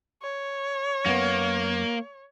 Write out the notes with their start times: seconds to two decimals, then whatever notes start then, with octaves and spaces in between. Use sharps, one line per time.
0.22 C#5
1.06 F#2 A#3 B3